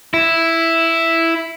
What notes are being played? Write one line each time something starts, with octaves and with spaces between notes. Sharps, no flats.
E4